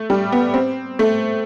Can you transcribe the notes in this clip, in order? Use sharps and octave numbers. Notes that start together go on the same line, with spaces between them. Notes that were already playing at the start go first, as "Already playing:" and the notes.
Already playing: A3
G3
B3
C4
A3